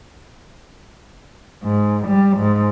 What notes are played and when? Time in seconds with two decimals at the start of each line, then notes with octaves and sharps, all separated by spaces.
1.63 G#2
2.08 G3
2.37 G#2